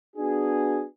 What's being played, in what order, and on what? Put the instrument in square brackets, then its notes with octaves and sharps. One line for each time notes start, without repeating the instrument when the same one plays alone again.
[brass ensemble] B3 D4 F#4 G#4